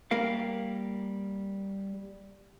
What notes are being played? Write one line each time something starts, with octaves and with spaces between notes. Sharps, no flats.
G3 A#3 A#4 F5